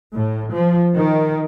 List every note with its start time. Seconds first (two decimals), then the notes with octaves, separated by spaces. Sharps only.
0.13 A2
0.52 F3
0.94 D#3